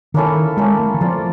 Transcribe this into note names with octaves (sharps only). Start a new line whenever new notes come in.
D#3 A#3 C#4 E4 A4
G#3 A#3 C#4 E4 A4
A3
E3
F3 C4 F4 A4 D5